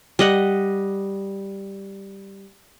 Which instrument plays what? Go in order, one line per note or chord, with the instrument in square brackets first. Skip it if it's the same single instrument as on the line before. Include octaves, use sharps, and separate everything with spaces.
[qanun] G3 D#5 F#5